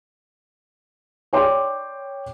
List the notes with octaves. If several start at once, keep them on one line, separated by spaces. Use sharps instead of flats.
C#5 D5 G5 C6 D6